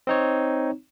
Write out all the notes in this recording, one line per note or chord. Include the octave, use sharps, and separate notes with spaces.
C4 D#4 C#5